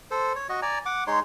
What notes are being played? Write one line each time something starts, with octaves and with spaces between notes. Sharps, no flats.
A4 C5
C#5
F#4 D#5
D5 G#5 A#5
F#5 D6
G#3 D#4 C#5 C6